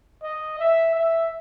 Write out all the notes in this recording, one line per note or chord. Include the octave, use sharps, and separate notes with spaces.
D#5
E5
E5